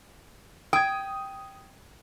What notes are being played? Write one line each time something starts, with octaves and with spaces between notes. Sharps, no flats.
G5 D#6 G#6